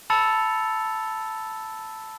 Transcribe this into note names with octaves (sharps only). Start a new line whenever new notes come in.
A5 B5 E6 A6 C#7 F7